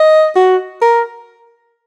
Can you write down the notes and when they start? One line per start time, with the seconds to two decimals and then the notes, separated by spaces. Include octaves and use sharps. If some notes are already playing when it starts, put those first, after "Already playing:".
Already playing: D#5
0.36 F#4
0.82 A#4